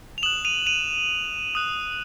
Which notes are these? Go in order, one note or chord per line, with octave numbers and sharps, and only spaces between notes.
F7
D#6 F#6 E7 F#7
D#7 F7
D#7 F7
D#6 F#6